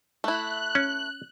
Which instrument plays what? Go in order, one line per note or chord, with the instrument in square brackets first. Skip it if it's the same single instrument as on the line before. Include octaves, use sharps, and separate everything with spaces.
[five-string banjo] A3 E4 [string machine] F#6
[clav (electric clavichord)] C#4